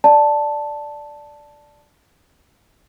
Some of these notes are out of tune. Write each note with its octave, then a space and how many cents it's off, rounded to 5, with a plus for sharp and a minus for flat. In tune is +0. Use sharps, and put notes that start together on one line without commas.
D5 +0 A5 +0